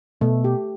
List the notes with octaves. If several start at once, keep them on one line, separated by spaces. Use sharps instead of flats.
B2 A3
G4